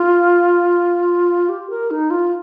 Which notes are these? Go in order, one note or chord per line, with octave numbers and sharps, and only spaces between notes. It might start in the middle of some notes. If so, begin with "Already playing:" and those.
Already playing: F4
G4
A#4
D#4
F4